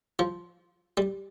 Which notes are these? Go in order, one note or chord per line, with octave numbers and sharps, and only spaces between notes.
F3
G3